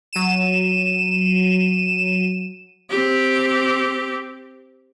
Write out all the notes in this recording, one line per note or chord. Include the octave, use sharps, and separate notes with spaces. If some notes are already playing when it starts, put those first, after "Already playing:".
F#3 D#7 E7
C4 G4